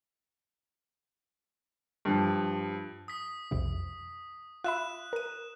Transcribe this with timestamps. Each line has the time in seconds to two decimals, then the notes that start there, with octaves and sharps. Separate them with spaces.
2.05 G2 F3
3.08 D#6 B6
3.51 B1 F2 C3
4.64 F4 E5 B5 F#6 E7
5.13 A#4 D#7